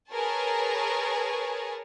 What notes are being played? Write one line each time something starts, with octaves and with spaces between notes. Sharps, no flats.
G#4 A#4 B4 C#5 G#5 A5